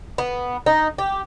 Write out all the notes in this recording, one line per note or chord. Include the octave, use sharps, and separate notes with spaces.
B3
D#4
G4